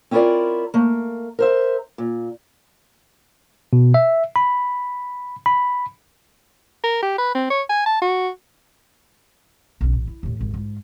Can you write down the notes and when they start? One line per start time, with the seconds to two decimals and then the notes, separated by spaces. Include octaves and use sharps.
0.11 C4 C#4 E4 F4 A#4 D5
0.74 A3 A#3
1.39 A#4 C5 E5
1.98 A#2
3.73 B2
3.94 E5
4.36 B5
5.46 B5
6.84 A#4
7.03 G4
7.18 B4
7.35 C4
7.51 C#5
7.70 G#5
7.86 A5
8.02 F#4
9.81 B1 C#4
9.94 A1
10.07 E4
10.23 D#2 A2
10.39 G#1 D#2
10.54 G#2 F4